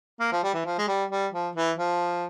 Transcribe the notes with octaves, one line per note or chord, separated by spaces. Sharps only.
A#3
F3
G3
E3
F3
G#3
G3
G3
F3
E3
F3